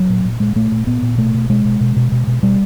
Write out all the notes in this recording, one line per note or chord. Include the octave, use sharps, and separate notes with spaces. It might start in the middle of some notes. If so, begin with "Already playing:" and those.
Already playing: F#3
A#2
A#2
A#2 G#3
A#2 A3
A#2
A#2 B3
A#2
B2 A3
B2
B2 G#3
B2
B2
B2
B2
B2
B2 G3